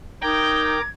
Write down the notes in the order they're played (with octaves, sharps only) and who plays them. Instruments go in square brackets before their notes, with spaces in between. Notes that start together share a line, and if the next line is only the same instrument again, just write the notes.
[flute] D#4 [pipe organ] A#4 A#5 D6 [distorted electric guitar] G5 [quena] G#6